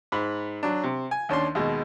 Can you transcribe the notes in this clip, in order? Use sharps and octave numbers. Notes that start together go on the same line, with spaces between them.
G#2 B5
F#3 D4
C3
G#5
D#2 C#4 D4 C6
D#2 B2 G#3